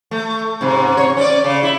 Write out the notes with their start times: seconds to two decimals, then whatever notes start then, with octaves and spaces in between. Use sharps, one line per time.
0.11 A3
0.61 G#2 C3
0.97 C#5
1.17 C#4 D5
1.44 C#3
1.63 E4